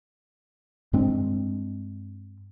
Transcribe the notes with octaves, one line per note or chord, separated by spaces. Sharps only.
G2 G#3 C4 D4